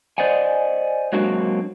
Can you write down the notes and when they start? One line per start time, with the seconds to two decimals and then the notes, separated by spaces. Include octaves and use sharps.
0.18 C5 D5 D#5 F#5 G#5
1.13 F#3 G#3 A#3 C4 D4 F#4